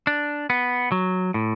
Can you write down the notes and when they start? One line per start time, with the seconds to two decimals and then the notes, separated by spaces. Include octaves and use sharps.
0.07 D4
0.50 B3
0.92 F#3
1.34 A2